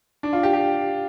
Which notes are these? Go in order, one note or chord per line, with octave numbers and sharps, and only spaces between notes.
D4
F4
G4
G4